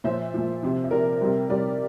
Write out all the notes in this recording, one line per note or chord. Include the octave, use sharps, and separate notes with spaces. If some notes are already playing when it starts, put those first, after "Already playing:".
A#2 F3 C5 E5
A#2 F3
C3 F3
E5
C3 F3 A#4 D5
C3 G3
C3 G3 A#4 D5